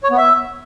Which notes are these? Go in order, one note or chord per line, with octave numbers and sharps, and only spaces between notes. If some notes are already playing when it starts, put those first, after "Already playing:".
C#5
B3
E5